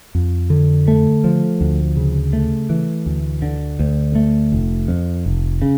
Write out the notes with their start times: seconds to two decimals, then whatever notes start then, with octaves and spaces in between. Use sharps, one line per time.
0.15 F2
0.50 D3
0.88 A3
1.24 F3
1.61 D2
1.97 C#3
2.33 A3
2.70 E3
3.06 D2
3.42 D3
3.79 D2
4.15 A3
4.52 F1
4.88 F2
5.26 F1
5.62 C#3